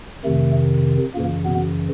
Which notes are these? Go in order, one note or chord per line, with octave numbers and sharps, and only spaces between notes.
F2 C3 D#3 A3
F#2 A#2 C#3 E3 A#3
B2 B3